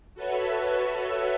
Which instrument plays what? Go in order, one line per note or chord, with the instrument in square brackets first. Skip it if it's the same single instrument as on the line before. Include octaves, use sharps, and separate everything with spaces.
[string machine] F#4 A4 B4 C#5 E5